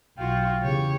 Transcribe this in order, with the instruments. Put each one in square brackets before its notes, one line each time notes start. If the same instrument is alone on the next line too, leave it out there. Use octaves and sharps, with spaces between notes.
[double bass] B1 [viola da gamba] F4 F#4 [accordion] F5 G5
[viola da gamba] E2 G4 C#5 [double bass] C#3